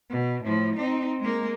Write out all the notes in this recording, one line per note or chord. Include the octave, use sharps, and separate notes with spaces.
B2
A2 F3
C4 D#4
G#3 A#3